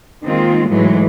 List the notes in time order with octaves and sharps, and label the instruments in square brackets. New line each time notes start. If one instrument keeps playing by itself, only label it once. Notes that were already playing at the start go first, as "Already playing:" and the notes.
[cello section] D#3 G#3 A#3 C4 F4
G#2 E3 F#3 G#3 A3